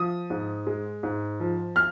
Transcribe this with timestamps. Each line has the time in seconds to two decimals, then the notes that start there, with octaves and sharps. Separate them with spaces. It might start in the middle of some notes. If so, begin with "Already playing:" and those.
Already playing: F3 D#6
0.30 G#2
0.67 G#3
1.03 G#2
1.40 F3
1.76 F6